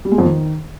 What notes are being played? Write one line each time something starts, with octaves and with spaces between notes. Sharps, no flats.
G3
G#3
F2
D#3